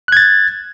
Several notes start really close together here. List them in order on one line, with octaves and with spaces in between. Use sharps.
F#6 G#6 A6